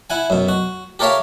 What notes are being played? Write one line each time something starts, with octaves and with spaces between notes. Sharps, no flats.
E4 F#5 G#5
F#2 B2
F#4
G4 A4 A#4 C#5 E5 F5